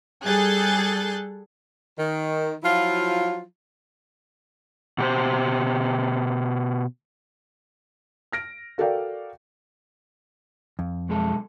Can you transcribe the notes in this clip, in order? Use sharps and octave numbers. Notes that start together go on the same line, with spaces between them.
G3 G#4 A4 F#6 G6 A6
D#3
F3 F#3 E4 F4
B2 G4 C5
F6 A#6 D7
F#4 A4 A#4 D5 F5 G5
F2
B1 G#3 A4